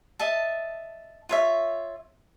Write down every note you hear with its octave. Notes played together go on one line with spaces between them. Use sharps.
D#5 E5 A5
F4 C#5 E5